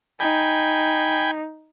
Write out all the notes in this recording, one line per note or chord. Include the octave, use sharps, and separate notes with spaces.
D#4 G5 G#5 B5